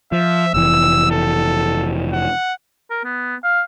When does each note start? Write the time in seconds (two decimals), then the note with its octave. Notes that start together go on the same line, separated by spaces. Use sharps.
0.12 F3 E5
0.54 F1 E3 E6
1.11 A4
2.13 F#5
2.90 A#4
3.04 B3
3.44 F5